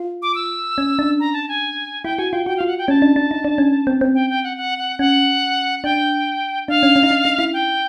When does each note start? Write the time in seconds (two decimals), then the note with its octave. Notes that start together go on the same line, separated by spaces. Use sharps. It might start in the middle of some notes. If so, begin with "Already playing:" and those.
Already playing: F4
0.22 D6
0.35 E6
0.78 C#4
0.99 D4
1.20 A#5
1.33 A5
1.49 G#5
2.04 E4 G5
2.18 F#4 G#5
2.32 F4 G5
2.46 F#4 G5
2.57 F4 F5
2.67 F#5
2.78 G5
2.88 C#4 A5
3.02 D4
3.16 D4
3.31 D#4
3.45 D4
3.58 C#4
3.87 C4
4.01 C4
4.15 G5
4.30 G5
4.44 F#5
4.57 F#5
4.78 F#5
4.99 C#4 F#5
5.84 D4 G5
6.68 D4 F5
6.83 C#4
6.96 C#4
7.03 D#4
7.11 D4
7.25 D#4
7.39 E4
7.53 G5